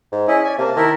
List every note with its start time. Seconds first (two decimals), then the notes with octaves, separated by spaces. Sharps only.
0.12 G#2
0.28 C#4 E4 D#5 G#5
0.45 D5 G#5
0.58 C3 A#3 A5
0.76 D#3 E4 A#4